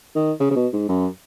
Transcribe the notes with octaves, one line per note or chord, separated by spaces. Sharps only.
D#3
C#3
C#3
B2
G#2
F#2